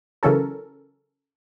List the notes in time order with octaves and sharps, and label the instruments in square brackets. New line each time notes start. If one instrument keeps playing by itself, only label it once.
[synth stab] C#3 E3 F#3 C#4 A4 A#4